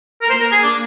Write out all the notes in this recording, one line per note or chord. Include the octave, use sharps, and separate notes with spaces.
A#4
A#3 C5
A#4
G#4
D4